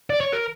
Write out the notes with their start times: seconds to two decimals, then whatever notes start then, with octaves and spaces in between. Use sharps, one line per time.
0.10 D5
0.21 C#5
0.33 A#4